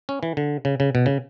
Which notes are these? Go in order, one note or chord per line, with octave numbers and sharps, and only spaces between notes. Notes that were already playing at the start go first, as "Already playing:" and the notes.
C#4
E3
D3
C#3
C#3
B2
C#3